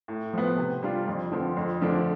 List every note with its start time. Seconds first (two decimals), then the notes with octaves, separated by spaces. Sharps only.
0.08 A2
0.33 F3 B3
0.58 C3
0.83 G3 D4 F4
1.08 F2
1.32 D3 F3 C4
1.57 F2
1.82 D3 F3 A3 D4